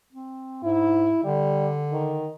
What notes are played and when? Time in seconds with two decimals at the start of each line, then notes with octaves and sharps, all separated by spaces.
0.12 C4
0.63 G#2 E4
1.24 D3 G3
1.92 D#3